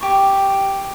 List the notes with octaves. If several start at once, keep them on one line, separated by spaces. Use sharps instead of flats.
G4 C#6